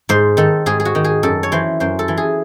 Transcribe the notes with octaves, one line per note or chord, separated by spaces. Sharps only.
G#2 C5
D#3 A4
G#2 G#4
G#4
F#4
D#3
G#4
F#2 A4
C#5
E3 C5
F#2 C5
A4
E3
G#4